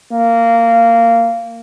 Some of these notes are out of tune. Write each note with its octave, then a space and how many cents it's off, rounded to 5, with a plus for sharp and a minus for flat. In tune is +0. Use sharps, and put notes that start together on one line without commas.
A#3 -15